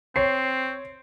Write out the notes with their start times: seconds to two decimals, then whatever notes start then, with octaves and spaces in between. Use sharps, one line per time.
0.16 C4 C#5 C7